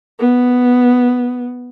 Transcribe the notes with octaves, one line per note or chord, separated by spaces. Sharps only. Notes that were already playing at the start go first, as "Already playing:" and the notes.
B3